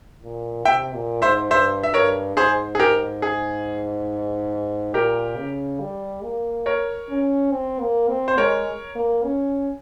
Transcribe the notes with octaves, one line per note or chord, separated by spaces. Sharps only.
A#2
C3 E5 G5
A#2
G#2 C5 E5
G2 C5 E5
E5
G2 A#4 C#5
G#2 G#4 C5
G#4
G4 A#4
G#4
A#2 G4 A#4
C#3
G3
A#3
A#4 C#5
C#4
C4
A#3
C4
C5
G#3 A#4 C#5
A#3
C#4